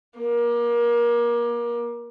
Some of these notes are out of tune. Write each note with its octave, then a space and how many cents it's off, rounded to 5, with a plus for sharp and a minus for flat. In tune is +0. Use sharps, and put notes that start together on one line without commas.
A#3 +30